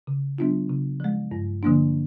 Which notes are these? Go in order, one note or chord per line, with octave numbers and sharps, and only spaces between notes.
C#3
F#3 B3 D4 F4
C#3
F3 G#3
G2
D3 F3 A#3 D4